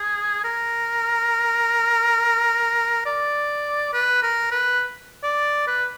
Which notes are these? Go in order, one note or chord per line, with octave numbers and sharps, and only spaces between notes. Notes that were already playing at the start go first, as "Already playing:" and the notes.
Already playing: G#4
A#4
D5
B4
A#4
B4
D5
B4